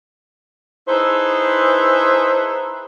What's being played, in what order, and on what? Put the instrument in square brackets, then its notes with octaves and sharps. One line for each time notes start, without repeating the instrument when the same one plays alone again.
[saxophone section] D#4 E4 G#4 A4 B4 C5